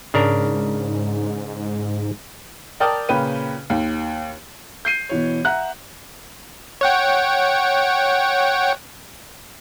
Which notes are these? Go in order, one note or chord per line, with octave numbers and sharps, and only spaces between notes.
G#2 C#3 D4 A#4
A#4 D5 G5 A5 D#6 F6
A#2 C#3 B4 G5 D#7
D#2
G6 C7 D#7
B2 E3 C#5
E5 F#5 A#5 F#6
C#5 F#5 G5